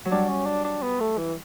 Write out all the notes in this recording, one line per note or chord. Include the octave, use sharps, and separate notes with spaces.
F#3
G3 D4
C#4
D4
D4
B3
A3
E3